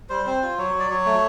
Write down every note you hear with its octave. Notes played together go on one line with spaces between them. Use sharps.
G3 C5
C4 C5
F4
F#3 C#5
F#3
D5
F#3 C#5
A3